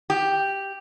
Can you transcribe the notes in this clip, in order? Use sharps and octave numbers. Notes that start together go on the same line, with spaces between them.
G4